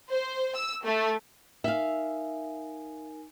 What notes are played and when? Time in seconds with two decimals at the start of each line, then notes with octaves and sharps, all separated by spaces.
0.10 C5
0.55 E6
0.84 A3
1.64 D#4 A#4 E5 F5 G#5